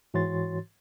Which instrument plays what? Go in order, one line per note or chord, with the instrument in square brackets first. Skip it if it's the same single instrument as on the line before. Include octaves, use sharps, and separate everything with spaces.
[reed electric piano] G#2 E3 F#4 C#5 C6 A6